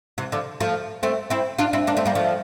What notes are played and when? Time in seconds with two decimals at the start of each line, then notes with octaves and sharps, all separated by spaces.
0.18 C3 E3
0.32 D3 F3
0.60 F3 A3
1.03 A3 C4
1.30 C4 E4
1.58 D4 F4
1.73 C4 E4
1.87 A#3 D4
1.97 A3 C4
2.05 G3 A#3
2.15 F3 A3